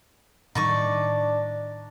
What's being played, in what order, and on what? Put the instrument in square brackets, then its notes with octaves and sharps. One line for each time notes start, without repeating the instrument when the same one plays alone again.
[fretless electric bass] A2 D#3 G3 [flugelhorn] D4 [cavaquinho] D#4 D5 C#6